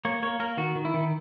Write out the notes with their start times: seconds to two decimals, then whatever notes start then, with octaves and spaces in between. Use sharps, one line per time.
0.05 A#3 C#5
0.23 A#3 C#5
0.40 A#3 A#4
0.57 D#3 F#4
0.76 D#3
0.85 E4
0.94 D#3